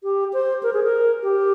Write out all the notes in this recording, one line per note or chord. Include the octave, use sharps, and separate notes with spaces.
G4
C5
A#4
G#4
A#4
G4